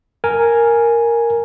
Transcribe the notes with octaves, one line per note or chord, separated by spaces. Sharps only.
A#4 G#5